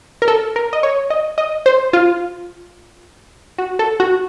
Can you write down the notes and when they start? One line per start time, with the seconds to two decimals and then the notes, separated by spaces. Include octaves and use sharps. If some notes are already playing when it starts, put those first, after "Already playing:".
0.22 A#4
0.28 A4
0.56 A#4
0.73 D#5
0.83 C#5
1.10 D#5
1.38 D#5
1.66 C5
1.93 F4
3.58 F#4
3.79 A4
4.00 F#4